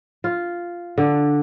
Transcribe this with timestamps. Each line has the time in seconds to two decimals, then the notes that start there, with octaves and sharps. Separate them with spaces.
0.24 F4
0.98 D3